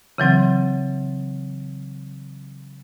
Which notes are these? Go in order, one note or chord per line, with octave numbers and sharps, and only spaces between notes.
C#3 E3 F#3 C4